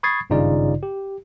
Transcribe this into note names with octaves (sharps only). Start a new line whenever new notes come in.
B5 C#6 D#6 G#6 A6 C7
G#1 G2 C#3 D#4 F4 D5
G4